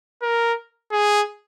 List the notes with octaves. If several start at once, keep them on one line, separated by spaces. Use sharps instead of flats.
A#4
G#4